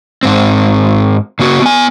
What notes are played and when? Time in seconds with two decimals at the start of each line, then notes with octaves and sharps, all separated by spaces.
0.23 G#2 C4
1.39 C#3 A#3 F#4
1.62 B3 G#5